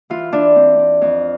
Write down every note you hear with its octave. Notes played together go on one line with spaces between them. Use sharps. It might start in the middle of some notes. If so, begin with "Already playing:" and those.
E3 F4
E3 D4
C4
C4
F2